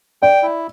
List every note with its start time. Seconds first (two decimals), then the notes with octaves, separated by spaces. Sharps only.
0.22 D5 G5
0.43 E4